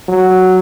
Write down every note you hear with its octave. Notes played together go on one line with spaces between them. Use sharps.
F#3